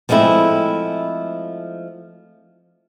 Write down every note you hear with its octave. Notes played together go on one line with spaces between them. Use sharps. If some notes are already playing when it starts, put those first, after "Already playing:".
F3 G#3 A3 C4 E4